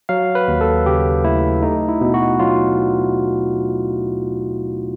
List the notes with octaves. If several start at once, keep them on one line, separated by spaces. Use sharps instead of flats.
F#3 F5
B4
D#2
A4
C#3 G4
A3 E4
A3 D#4
E4
B2
F#4
F#3 F4